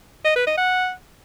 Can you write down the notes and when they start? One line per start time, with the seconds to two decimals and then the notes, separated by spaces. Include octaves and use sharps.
0.25 D#5
0.36 B4
0.47 D#5
0.58 F#5